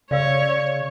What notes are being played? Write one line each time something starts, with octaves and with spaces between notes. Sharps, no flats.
C#3 C#5 D5 F5 E6